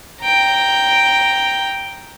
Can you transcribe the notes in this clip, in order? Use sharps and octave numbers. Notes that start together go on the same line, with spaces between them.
G5 A#5